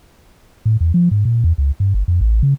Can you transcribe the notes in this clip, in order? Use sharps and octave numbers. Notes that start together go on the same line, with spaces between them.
A2
E2
F3
G#2
A#2
E2
C#2
G2
G1
F2
A1
C#3